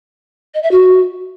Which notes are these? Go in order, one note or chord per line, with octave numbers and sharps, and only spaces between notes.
D#5
E5
F#4